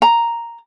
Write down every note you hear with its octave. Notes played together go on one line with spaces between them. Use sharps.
A#5